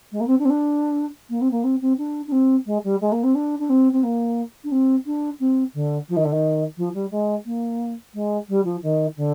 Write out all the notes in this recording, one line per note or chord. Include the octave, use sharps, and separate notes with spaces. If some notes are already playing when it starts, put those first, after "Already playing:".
G#3
A#3
C4
D4
C4
D4
A#3
C4
A#3
C4
C4
D4
D4
C4
G#3
G3
G#3
A#3
C4
D4
D4
C4
C4
A#3
D4
C4
D4
C4
D3
F3
D#3
D3
D#3
F3
G3
G#3
A#3
G#3
G3
F3
D#3
D3